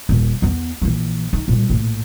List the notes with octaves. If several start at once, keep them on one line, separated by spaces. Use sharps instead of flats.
D#1 A#2
E2 B3
A#1 E3
D#4
A#2 G3
A#1 A2